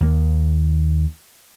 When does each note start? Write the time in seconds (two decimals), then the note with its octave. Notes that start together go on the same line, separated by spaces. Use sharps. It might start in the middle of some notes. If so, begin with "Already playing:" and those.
0.01 D#2 A#3